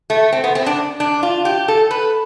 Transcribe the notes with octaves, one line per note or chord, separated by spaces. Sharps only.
A3
C4
B3
C4
D4
D4
F4
G4
A4
B4